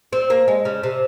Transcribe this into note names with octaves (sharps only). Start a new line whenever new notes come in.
C4
A#3
G#3
C#3
C3